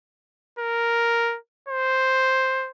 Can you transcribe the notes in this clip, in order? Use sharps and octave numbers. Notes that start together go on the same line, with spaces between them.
A#4
C5